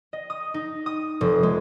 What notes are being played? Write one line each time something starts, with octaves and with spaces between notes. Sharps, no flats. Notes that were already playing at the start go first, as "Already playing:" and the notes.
D#5
D#6
D#4
D#6
F1
G#3